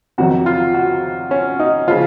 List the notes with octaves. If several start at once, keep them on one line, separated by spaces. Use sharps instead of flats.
F2 C3 D#3 F#3 F#4
F4
F#4
C#4
D#4
C#3 F3 F4